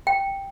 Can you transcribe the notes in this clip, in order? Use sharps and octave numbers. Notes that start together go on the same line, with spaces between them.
G5